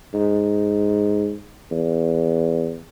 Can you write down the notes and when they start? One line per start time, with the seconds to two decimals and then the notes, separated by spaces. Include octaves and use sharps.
0.14 G#2
1.71 E2